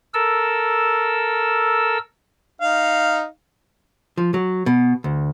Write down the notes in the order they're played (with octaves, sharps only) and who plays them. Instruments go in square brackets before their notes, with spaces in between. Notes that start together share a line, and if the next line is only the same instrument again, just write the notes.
[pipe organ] A4 A#4 E6
[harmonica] D#4 F5
[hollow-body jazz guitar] F3
F#3
B2
D2